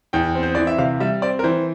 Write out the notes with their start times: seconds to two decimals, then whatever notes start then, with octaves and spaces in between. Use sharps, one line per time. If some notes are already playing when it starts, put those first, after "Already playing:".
0.13 E2 G5
0.35 C4
0.43 C5
0.55 E3 D5
0.67 E5
0.78 C3 F5
1.00 G3 E5
1.22 C4 D5
1.39 A#4
1.44 E3 C5